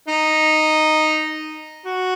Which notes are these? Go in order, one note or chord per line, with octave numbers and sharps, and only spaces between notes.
D#4
F#4